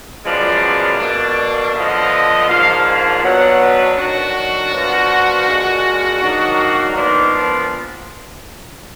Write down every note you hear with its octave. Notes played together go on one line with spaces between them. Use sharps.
F#2 F3 G#3 B3 D4 D5
B2 A#3 D4
D3 F3 B3 D#5
G#2 F3 A#3 D4 F5
G#5
B2 F#3 B3 D4 F#5
B4
D#3 F#3 D4 F#4
A#2 F3 B3 D4
A#2 G#3 D4
G#2 D#3 F#3 A#3 D4
A#2 F3 B3 D4 D#4
D4